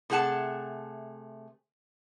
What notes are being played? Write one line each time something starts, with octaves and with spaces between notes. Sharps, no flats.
C3 A3 G#4 F#5 A5